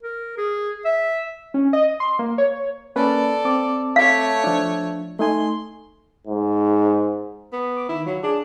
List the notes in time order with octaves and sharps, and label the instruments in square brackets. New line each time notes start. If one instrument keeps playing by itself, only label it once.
[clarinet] A#4
G#4
E5
[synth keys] C#4
D#5
C6
A#3
C#5
[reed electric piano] A#3 C#4 B4 [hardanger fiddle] A4 D5
[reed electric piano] C4 D6
[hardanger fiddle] A3 C#5 [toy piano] F5
[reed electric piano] F3 D4
[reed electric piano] A3 D#4 G#5 [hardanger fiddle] C6
[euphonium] G#2
[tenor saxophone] B3
[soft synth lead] D6
[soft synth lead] D#3 [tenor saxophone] E4
[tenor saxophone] F#3 [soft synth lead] F4
[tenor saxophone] D4 [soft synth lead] G#4